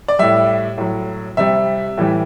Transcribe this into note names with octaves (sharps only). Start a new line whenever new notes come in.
D5
A2 G3 E5
A2 F#3
C3 G3 E5
A2 E3 G3